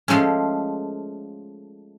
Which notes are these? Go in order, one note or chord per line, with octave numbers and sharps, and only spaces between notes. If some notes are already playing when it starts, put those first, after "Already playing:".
F3 G#3 A3 C#4